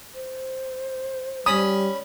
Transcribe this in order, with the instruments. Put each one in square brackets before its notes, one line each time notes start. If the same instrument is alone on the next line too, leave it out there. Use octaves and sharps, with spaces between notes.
[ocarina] C5
[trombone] G3 [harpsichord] C#4 B5 [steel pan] D#6